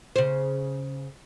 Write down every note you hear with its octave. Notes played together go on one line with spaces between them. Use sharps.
C#3 C5